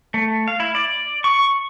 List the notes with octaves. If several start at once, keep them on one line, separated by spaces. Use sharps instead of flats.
A3
F5
E4
D5
C#6